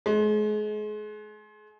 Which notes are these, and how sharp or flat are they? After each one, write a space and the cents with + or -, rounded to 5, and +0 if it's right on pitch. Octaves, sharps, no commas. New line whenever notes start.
G#3 +35